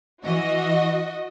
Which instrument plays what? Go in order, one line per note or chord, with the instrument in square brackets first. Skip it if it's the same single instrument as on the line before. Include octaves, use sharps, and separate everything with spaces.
[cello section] E3 [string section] F#4 D#5